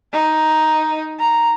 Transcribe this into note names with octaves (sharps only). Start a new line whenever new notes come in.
D#4
A#5